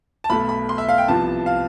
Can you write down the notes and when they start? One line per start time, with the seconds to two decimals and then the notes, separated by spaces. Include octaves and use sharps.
0.24 A5
0.30 B1 B2 A3 B5
0.49 B5
0.69 C6
0.78 E5
0.89 F5
0.98 G5
1.08 C2 C3 F3 B3 A5
1.46 F5